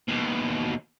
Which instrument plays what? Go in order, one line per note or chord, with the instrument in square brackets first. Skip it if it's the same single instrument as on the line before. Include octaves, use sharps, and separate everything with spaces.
[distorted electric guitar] D#2 B2